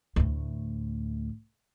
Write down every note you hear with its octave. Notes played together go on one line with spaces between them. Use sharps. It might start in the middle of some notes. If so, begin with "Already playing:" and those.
D2 A2